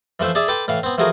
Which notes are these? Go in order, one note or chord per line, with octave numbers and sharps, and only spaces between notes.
E3 F3 A3 C5 E5
D4 G#4 D5 E5
A4 B4 G5 C6 D6
A2 E3 F5
B3 C4
E3 F3 A3 F#4 G#4 A#4